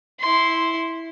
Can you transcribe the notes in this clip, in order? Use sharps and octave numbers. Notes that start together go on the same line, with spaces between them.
E4 C6